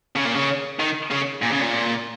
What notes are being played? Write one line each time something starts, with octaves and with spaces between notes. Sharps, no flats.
C#3
A#2
C#3
D#3
C#3
A#2
C#3
A#2